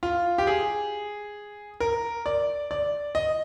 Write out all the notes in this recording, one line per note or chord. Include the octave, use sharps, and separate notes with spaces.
F4
G4
G#4
A#4
D5
D5
D#5